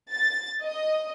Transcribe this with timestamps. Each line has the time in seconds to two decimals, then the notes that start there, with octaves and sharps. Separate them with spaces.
0.12 A6
0.62 D#5